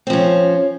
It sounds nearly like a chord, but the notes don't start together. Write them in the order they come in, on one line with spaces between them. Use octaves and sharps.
C4 F3 C#4